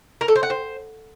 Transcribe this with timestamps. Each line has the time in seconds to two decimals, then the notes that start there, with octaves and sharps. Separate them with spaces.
0.21 A#4
0.28 A4
0.35 C5
0.43 F#5
0.50 C5